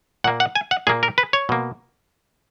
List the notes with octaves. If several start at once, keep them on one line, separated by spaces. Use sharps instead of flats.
A#2 A#3 F#5
F#5
G#5
F#5
A#2 A#3 G#4
A#4
B4
C#5
B2 A#3